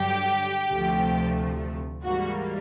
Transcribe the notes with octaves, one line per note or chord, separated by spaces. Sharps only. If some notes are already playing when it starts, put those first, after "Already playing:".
Already playing: G2 D3 F#3 G4
D2 C3 F3 A3
G#2 E3 G3 A#3 F#4